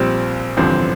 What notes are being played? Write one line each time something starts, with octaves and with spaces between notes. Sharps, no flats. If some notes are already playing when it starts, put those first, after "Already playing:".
Already playing: A#1 A#2 G3 C4
A1 G2 D3 F3 C4